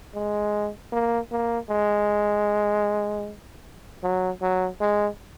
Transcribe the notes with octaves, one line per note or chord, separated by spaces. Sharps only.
G#3
A#3
A#3
G#3
F#3
F#3
G#3